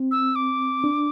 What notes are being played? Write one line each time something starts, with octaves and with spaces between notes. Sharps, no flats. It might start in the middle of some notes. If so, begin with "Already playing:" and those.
Already playing: C4
E6
D6
D4